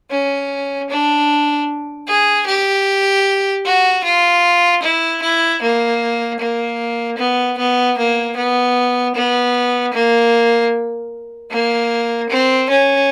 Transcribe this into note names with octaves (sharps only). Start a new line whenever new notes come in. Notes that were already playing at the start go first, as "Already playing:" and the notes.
C#4
D4
G#4
G4
F#4
F4
E4
E4
A#3
A#3
B3
B3
A#3
B3
B3
A#3
A#3
C4
C#4